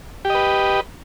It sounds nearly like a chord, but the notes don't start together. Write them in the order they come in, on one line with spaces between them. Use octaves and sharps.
G4 D#5 B4